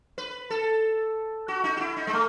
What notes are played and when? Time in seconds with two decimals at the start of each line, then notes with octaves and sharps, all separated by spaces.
0.18 B4
0.50 A4
1.48 F#4
1.64 D#4
1.77 F#4
1.80 E4
1.97 D#4
2.07 G#3
2.13 A3